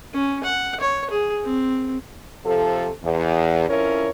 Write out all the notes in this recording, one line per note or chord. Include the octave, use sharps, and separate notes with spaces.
C#4
F#5
C#5
G#4
C4
C3 F3 A4
E2
F2 C#4 E4 A#4 C#5